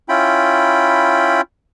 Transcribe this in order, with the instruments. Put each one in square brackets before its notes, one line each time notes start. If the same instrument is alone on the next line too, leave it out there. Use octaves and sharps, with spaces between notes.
[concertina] C#4 E4 F4 G5 B5